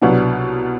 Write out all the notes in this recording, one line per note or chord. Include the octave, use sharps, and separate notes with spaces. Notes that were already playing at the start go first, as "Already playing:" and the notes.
C2 B2 F#3 B3 D4